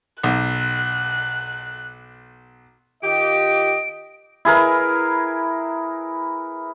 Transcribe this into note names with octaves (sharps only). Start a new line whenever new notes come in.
B1 F#6
D#3 F4 G4 D#5 D7
E4 G#4 A#4 B4